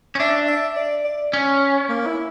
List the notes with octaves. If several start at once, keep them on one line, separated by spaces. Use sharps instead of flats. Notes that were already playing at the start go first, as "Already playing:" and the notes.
C#4
D4 E5
E5
D5
D5
C#4 C#5
A#3
E4